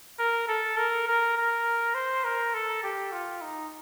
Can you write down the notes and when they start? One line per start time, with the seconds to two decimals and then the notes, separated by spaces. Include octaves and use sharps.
0.19 A#4
0.48 A4
0.77 A#4
1.07 A#4
1.36 A#4
1.95 C5
2.25 A#4
2.54 A4
2.83 G4
3.12 F4
3.42 D#4